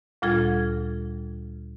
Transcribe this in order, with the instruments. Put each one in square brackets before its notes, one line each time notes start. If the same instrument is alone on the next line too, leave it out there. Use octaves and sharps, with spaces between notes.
[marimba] D2 A#2 G3 F4 A4 G#6